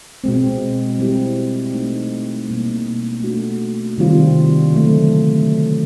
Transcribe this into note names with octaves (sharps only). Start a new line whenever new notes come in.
B2 G#3 C4
G3 C4 E4 G4
A3 C4 D#4
B2 G3 A#3
A3 D4 F#4
C3 D#3 G3 C4 F4
D3 F#3 A3